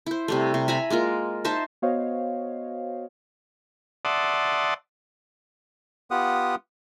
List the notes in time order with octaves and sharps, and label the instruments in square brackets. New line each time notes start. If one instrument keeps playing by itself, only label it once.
[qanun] E4 C5
C3 G3 A3
C3
E5 G#5 A#5 B5
G#3 A#3 F4 A#4
D#4 C5 E5 A5
[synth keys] B3 F#4 C5 C#5 D#5 F5
[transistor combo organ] D5 E5 F#5 A5 C6 D#6
[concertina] B3 F4 G4 F#5 D#6